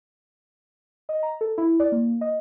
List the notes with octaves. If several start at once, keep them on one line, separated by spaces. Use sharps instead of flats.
D#5
A#5
A4
E4
D5
A#3
D#5